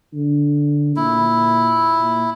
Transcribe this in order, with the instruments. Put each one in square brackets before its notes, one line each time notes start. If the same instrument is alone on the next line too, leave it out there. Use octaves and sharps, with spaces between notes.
[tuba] D3
[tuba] A#2 [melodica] E4
[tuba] A#2